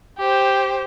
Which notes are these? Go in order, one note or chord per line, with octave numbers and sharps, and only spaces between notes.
G4 C5